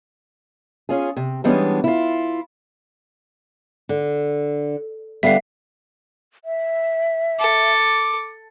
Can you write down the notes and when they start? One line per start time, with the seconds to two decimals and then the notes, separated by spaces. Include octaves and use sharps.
0.89 C#4 F4 G#4
1.17 C3
1.44 E3 G3 G#3 B3 C#4 D4
1.84 E4 F4
3.89 D3
5.23 D3 G3 B3 E5 F5
6.45 E5
7.40 A4 D6